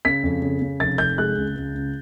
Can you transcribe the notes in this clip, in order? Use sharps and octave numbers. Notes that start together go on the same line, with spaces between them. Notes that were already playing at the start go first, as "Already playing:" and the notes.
C#3 B6
F2
C#3
C#3
F1 A6
F1 G6
G#3 F#6
C#2
C#2
C#2